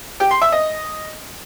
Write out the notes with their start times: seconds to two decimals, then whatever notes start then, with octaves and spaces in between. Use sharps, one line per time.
0.20 G4
0.31 C6
0.42 E5
0.52 D#5